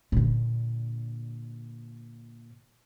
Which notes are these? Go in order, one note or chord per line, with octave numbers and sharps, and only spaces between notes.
A#2 D3